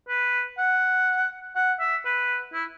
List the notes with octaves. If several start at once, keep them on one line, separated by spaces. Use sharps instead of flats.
B4
F#5
F#5
E5
B4
E4